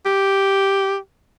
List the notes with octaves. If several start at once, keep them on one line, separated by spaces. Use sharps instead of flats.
G4